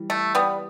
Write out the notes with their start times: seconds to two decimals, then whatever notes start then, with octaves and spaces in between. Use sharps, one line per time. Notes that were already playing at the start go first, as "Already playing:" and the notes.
Already playing: E3 G3
0.10 A3
0.35 G3 B3